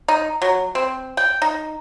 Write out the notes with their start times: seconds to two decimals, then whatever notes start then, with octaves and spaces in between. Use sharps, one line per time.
0.08 D#4
0.42 F#3
0.75 C4
1.17 G5
1.42 D#4